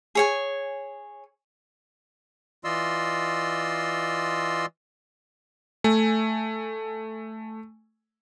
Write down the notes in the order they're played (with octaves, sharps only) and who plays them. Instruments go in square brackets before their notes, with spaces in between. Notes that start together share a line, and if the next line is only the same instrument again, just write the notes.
[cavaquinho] G#4 C#5 G#5
[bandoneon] E3 F4 D5 D#5 C6 E6
[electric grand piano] A3 G#5